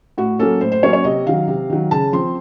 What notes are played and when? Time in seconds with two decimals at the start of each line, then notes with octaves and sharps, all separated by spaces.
0.18 A2 F#4
0.39 F#3 A#3 C#4 A4
0.61 A2 C5
0.72 C5
0.83 F#3 A#3 C#4 C#5
0.93 C#5
1.04 C3 D#5
1.26 D#3 F#3 F5
1.47 C3
1.70 D#3 F#3
1.91 C#3 A5
2.12 F3 C4 C6